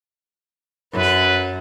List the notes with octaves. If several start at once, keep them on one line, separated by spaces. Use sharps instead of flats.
F#2 B4